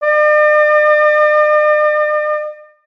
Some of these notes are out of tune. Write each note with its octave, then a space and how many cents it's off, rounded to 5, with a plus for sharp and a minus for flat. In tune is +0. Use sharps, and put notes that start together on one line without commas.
D5 +45